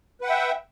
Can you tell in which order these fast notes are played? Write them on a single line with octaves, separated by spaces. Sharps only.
B4 F#5 G5 E5